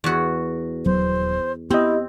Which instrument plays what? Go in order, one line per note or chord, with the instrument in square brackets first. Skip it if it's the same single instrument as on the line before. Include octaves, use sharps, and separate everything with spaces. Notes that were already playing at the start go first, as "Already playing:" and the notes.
[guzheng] E2 F#4
[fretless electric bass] D#1 F#3 B3 [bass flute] C5
[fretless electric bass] B3 [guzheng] C4 [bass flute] E4 [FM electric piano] G4 D#5